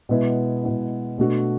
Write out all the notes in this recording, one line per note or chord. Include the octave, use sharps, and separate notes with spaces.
B2 G#3 B3 E4
B2 G#3 B3 E4
B2 A3 D4 F#4